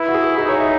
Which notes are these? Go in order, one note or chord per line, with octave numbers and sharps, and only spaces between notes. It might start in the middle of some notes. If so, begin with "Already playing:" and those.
Already playing: E4 B4
F#4
G#4
D#4 G#4
C#5
E5